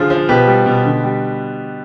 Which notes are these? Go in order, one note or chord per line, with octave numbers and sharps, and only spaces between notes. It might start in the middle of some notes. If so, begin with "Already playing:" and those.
Already playing: D3 F3 F4 G#4
F3
B2 G4 B4
G3
B2
D3
G3